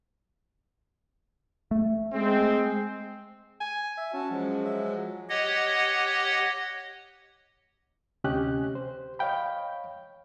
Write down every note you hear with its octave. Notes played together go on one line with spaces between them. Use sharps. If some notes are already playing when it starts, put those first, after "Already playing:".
A3
G#3 C4
G#5
E5
C#4 F#4 A5
F3 F#3 G#3
E5
G4 C#5 D#5 F#5
D2 C3 C#4 G4 D#5 F#6
C5
C#5 D#5 F5 G5 B5